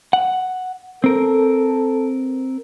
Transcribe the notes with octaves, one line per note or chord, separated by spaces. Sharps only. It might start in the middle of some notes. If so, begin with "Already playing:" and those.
F#5
C4 A4 A#4